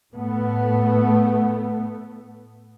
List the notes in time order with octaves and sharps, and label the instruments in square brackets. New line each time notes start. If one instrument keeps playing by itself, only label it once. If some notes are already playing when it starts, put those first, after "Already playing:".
[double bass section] A2 A3 B3